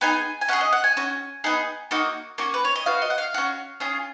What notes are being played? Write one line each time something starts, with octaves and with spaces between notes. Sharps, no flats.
B3 D#4 G#4 G#5
G#5
C#4 F4 G#4 F#5
D#5
F#5
G#5
C#4 F#4
B3 D#4 G#4
A#3 D#4 F#4
A#3 C#4 F#4
B4
C#5
D#5
B3 F#4 F5
D#5
F#5
F5
C#4 F#4
C#4 F4 G#4